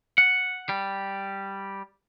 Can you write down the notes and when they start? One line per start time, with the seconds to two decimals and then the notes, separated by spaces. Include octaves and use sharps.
0.18 F#5
0.69 G3